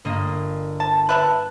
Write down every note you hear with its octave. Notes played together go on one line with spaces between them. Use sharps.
G1 A#3 D#5
A5
B4 E5 A5 F#6